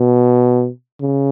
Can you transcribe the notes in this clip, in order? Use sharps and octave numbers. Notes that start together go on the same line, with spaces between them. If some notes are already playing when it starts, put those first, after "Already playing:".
Already playing: B2
C#3